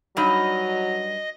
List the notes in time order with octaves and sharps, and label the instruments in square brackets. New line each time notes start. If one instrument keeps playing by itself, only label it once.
[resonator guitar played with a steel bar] G2 D#4 [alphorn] F#3 [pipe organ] D#5